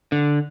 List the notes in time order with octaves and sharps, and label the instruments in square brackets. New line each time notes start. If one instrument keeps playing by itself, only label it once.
[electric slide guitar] D3